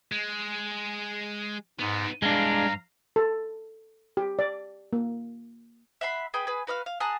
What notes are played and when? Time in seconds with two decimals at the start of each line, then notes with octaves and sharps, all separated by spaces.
0.12 G#3
1.79 G#2 B3 D#4
2.22 G2 G#3 D4 F5 A#5
3.16 A4
4.17 G4
4.39 D5
4.93 A#3
6.01 E5 F#5 B5 C6
6.34 G#4 B4 G5 B5
6.47 G#4 B4
6.67 F#4 B4 D#5 F5
6.86 F5
7.00 G#4 F#5 A5 A#5